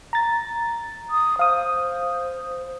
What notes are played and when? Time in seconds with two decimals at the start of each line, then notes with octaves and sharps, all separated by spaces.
0.13 A#5 A6
1.10 D#6
1.39 C5 F5 D#6